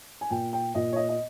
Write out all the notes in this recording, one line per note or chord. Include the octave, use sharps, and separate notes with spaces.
G#5
A#2 G5
G5
A#2 D#5
C#5
D#5
D#5